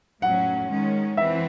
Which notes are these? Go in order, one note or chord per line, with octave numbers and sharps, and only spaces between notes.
A2 F#3 C#4 F#5
D#3 G#3 C#4
E3 C4 E5